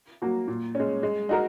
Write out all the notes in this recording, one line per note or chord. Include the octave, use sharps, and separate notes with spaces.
F#3 A#3 F#4
A#2
G#3 C#4
G#3
D#4 F#4 A#4